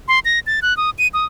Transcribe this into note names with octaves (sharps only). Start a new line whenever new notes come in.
C6
A#6
A6
F#6
D#6
D#7
D#6